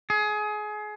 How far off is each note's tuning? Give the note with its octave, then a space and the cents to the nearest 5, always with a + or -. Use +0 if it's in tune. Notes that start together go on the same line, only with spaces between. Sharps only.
G#4 +25